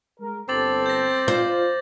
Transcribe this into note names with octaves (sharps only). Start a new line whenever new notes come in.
G#3 A#4
G1 C4 A4 D6 A6 F#7
G6 A#6
F4 C5